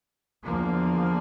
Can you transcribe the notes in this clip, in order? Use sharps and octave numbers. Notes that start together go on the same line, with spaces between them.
E2 D3 F3 A#3